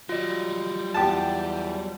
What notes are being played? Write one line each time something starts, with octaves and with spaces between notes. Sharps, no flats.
F#3 G3 F4 D#5
E2 G4 A5